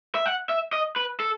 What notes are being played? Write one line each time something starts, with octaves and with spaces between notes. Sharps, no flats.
E5
F#5
E5
D#5
B4
A4